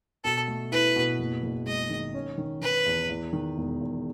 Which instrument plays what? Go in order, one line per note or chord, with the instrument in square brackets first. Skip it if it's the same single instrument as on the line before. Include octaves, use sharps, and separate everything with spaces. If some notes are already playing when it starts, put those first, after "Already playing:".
[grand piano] B2 [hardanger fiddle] A4
[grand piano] A3
[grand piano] E4 [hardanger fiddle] B4
[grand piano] B2
F#1
F#1
[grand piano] G#3 [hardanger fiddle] D#5
[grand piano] D#3
C#4
D#3
[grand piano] D#3 [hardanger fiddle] B4
[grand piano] E2
E2
D#3
E1
E2